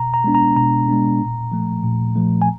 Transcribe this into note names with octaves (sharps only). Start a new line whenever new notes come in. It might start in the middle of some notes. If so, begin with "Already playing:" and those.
Already playing: B2 A#5
A#5
G#3 B3 D4
A#5
B2 A#5
G#3 B3 D4
A#2
F3 A3
A#2
F3 A3
G#5